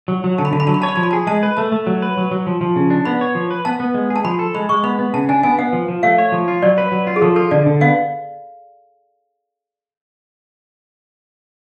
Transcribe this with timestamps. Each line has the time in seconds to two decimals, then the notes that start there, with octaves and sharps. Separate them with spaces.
0.08 F#3
0.24 F#3
0.38 D3 A5
0.45 B5
0.53 D3 A5
0.60 B5
0.67 F#3 A5
0.74 B5
0.82 C#5 A5
0.88 B5
0.96 F3 A5
1.03 B5
1.11 G#4 A5
1.27 G#3 A5
1.43 B4
1.57 A3 A5
1.72 A3
1.87 F#3
2.02 B4
2.17 F#3
2.31 F#3
2.47 F3
2.61 F3
2.76 C#3
2.90 D4
3.05 B3 B5
3.21 C#5
3.35 F3
3.51 B4
3.65 B3 A5
3.80 B3
3.94 G#3
4.10 G#4
4.16 A5
4.24 F3 B5
4.39 A4
4.55 G#3 B5
4.69 G#3 C#6
4.83 B3 B5
4.99 B3
5.14 C#3 A5
5.29 D4 G#5
5.43 B3 G#5
5.58 B3 F#5
5.73 F3
5.88 F3
6.03 A3 F5
6.18 C#5
6.32 F3
6.48 F4
6.62 F#3 D5
6.78 B4
6.92 F#3
7.07 F4
7.16 G#4
7.22 F3 A4
7.36 F4 A4
7.51 D3 D5
7.66 D3
7.81 B3 F5